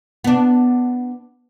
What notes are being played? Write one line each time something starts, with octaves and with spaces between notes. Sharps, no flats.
B3 D4